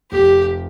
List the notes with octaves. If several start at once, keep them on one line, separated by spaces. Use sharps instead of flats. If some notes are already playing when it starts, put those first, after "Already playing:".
F1 G4